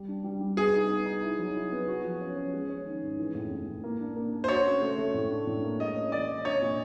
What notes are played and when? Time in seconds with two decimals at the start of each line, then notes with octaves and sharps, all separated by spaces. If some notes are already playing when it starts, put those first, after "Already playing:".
Already playing: G3
0.08 D4
0.24 G3
0.41 G3
0.57 B3 G#4
0.74 D#4
0.90 B3
1.06 D#4
1.22 E4
1.39 F#3
1.55 E4
1.72 B3
1.88 F#4
2.04 F3
2.21 C#4
2.36 C#4
2.53 G#3
2.69 C#4
2.86 D#3
3.02 G#2
3.19 E3
3.35 A2
3.51 A2
3.68 A2
3.84 A#3
4.00 D4
4.16 A#3
4.33 D4
4.44 C5
4.48 F#4 C#5
4.65 C#4
4.82 A3
4.98 A3
5.14 A2
5.31 D4
5.47 A2
5.64 A#3
5.80 G#3 D#5
5.96 C#4
6.12 E3 D5
6.28 C#4
6.45 D4 C#5
6.61 A#2